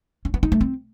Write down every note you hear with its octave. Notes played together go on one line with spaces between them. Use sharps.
C#4
B3
D#4
A3
C4